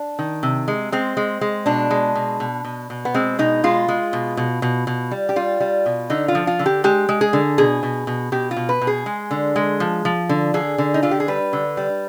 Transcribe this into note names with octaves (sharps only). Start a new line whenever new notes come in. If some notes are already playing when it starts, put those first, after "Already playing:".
Already playing: D4
D#3
C3
G#3
G#3 C4
G#3
G#3
B2 D4
G#3
B2
B2
B2
B2
B3
G#3 C4
B2 D#4
G#3 F4
G#3
B2
B2
B2
B2
G3
G4
G3 F4
G3
B2
D3 D#4
F4
F3
F4
D3
G4
G#3 G4
G#3
G#4
D3
B2 G#4
B2
B2
B2 G4
F4
B2
B4
B2
G#4
G#3
D3
G#3
F3
F3
D3
D3 G#4
D3
D#4
D3 F4
G4
G#4
G3 B4
D3
G3